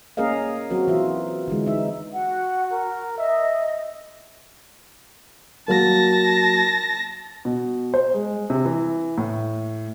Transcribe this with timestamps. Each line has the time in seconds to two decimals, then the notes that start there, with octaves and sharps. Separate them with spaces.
0.17 A#3 C#4 G#4 A#4 D#5 F5
0.70 F#3 C4 F#4 A#4
0.88 E3 F4 E5
1.48 D3 E3 G#3
1.66 D#4 E5
2.13 F#4 F#5
2.72 A#4
3.18 D#5 E5
5.68 F#3 A#3 A5 A#6
7.45 B2
7.94 C5
8.14 G#3
8.50 C3
8.65 E3
9.18 A2